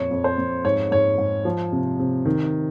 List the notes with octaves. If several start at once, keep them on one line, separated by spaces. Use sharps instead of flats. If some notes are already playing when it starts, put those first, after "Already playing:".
Already playing: F2 A#2 C#5
F2
C5
F2
G#2 C#5
G#2 C#5
G#2
F3
C3
C3
D#3